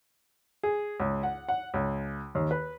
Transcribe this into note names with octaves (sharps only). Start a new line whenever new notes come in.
G#4
C#2
F#5
F#5
C#2
D#2
B4